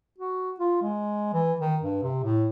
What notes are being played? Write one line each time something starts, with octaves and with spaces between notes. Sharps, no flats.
F#4
F4
G#3
E3
D#3
G2
C3
A2